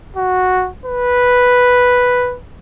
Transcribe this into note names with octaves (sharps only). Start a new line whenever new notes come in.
F#4
B4